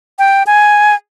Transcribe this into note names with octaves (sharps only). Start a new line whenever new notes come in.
G5
G#5